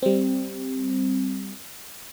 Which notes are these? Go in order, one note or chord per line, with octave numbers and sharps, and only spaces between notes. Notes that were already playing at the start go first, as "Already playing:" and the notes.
G3 C4